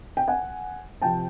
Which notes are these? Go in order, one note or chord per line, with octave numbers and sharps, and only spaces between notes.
G5
F#5 G#5
C3 F3 G5 A5